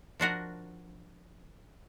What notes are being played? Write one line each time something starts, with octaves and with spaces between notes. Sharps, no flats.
F3 D4 F#4 A#4